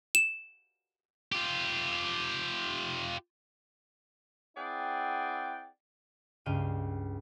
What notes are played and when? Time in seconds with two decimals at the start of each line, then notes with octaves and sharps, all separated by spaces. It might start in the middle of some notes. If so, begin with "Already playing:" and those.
0.15 E7
1.32 F4 G4
4.57 C4 E4 G#4 D5 F#5 G5
6.46 C#2 G2 F5 G5 D#7